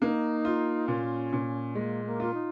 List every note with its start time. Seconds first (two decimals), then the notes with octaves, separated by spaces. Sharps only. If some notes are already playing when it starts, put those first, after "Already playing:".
0.01 A#3 D#4
0.45 F4
0.88 A#2 C#4
1.33 A#2
1.75 G#3 A#3
2.05 A#3
2.20 F4
2.34 D#4